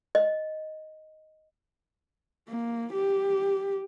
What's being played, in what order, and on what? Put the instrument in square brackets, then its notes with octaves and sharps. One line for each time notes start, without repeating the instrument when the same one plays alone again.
[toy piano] D#5
[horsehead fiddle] A#3
G4